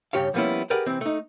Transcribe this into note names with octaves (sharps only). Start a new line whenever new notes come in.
G2 C#3 G4 C#5 F5
F3 G3 A#3 B3 C#4 E4
G4 G#4 A#4 B4 D5 F#5
C3 E3 C4
A3 D#4